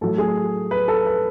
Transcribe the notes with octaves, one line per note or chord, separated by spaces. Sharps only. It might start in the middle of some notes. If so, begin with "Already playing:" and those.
A2 F#3 A4
G#4
B4
A4
B4